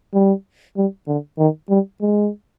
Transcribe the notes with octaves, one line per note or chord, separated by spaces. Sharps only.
G3
G3
D3
D#3
G3
G#3